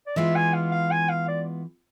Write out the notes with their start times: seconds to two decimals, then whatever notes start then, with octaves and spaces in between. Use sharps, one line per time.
0.07 D5
0.16 E3 G#3 B3 F4 E5
0.36 G#5
0.54 F5
0.72 F5
0.91 G#5
1.09 F5
1.28 D5